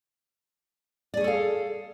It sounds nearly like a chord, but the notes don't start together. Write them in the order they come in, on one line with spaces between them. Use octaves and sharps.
D5 G#4 C#5 A4 F5